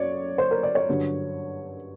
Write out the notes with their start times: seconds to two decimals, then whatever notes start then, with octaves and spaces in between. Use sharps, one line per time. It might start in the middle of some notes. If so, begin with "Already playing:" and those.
Already playing: F#2 C#5 D5
0.38 C5
0.51 A#4
0.63 D5
0.75 C#5
0.89 G2 D3 F#3